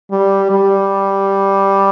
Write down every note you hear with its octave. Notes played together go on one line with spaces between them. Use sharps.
G3
G3